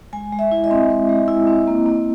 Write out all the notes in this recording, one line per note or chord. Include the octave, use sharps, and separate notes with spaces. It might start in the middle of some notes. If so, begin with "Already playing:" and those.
G#3 G#5
G#3
E5
E4
D#5
C4
G#3
G#3
E4
C4
A#3
A#3